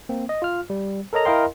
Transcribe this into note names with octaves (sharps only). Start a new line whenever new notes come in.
A#3 C4
D#5
F4 F6
G3
A4 A#4 C#5 D#5 A#5
E4 A#4 D#5 F5 G5 C6